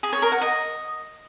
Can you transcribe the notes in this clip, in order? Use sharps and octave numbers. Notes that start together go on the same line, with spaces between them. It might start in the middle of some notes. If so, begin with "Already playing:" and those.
G#4
C#5
A#4
F#5
D#5